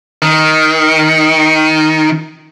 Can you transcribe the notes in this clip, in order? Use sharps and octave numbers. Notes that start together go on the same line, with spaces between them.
D#3